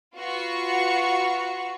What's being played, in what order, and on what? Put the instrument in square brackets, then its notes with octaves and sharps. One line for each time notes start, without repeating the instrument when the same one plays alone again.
[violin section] F4 F#4 B4 C#6